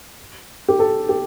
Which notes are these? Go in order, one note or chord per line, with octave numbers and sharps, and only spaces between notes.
G4
A4
G4